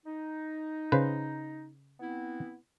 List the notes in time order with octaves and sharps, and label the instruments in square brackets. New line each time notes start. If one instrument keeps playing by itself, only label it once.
[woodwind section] D#4
[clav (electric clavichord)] C#3 B4 C5
[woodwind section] B3 C4 E4